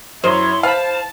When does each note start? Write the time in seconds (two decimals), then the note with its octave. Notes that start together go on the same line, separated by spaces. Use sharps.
0.24 F#2 E4 A#4 C5 C#5 D#5 C6
0.63 B4 C5 F5 A5 B5